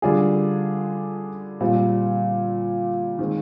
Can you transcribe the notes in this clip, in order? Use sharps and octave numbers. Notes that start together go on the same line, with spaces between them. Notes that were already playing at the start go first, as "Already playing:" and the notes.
D3 G3 D4 F4 G#4
A#2 G3 C4
D#3 G#3 C4